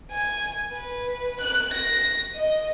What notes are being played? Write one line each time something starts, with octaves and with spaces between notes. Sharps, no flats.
G#5
B4
F#6
A#6
D#5